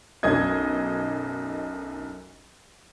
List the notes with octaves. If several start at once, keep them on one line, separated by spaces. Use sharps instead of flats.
B1 F#2 D4 D#5 G#6